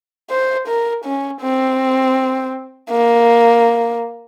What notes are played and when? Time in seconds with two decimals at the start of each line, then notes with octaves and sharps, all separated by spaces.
0.31 C5
0.68 A#4
1.05 C#4
1.41 C4
2.91 A#3